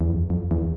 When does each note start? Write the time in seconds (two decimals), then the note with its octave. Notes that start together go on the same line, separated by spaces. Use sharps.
0.01 E2
0.09 F2
0.30 F2
0.51 E2